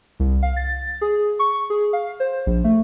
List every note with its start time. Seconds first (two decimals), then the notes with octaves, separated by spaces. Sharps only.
0.20 C2
0.43 F5
0.56 A6
1.01 G#4
1.39 C#6
1.70 G#4
1.93 F5
2.20 C5
2.47 A#1
2.64 A3